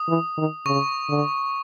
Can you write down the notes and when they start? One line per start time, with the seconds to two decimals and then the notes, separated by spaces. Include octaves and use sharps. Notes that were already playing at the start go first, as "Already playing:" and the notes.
Already playing: D#6
0.08 E3
0.37 D#3
0.66 C#3 C#6
1.09 D3